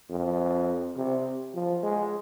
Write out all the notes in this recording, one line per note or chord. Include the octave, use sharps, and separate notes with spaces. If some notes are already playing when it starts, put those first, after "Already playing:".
F2
C3
F3
G#3